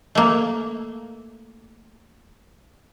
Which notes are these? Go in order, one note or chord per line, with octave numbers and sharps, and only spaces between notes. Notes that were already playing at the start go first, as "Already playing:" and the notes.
A3 A#3